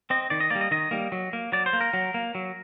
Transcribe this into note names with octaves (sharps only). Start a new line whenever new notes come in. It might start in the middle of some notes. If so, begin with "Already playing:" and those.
C4 D#5
D#3 D5
D#5
G3 A#3 D5
D#5
D#3 D#5
G3 A#3
F#3
A#3
F#3 D5
C5
A#3
A#4
F#3
A#3
F#3